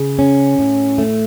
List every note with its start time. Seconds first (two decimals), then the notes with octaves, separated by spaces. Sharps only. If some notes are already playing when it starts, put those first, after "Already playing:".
Already playing: C#3
0.19 C#4
0.59 A2
0.98 A3